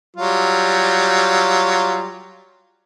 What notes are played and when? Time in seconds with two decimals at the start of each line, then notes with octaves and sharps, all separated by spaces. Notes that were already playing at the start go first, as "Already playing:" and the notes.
0.17 F#3 G3 F4